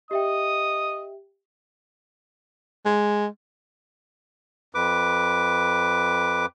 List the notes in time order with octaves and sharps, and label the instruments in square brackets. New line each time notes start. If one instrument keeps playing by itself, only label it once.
[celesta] G4 E5 G5 [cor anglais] D#5 [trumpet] D#6
[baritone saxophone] G#3
[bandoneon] F2 B4 D6